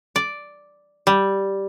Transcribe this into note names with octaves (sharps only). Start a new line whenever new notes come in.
D5
G3